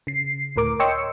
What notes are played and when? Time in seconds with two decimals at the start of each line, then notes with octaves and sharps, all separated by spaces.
0.07 C#3 C7
0.56 D2 A2 A#4 D6
0.80 C#5 D#5 G5 C6 E6 C#7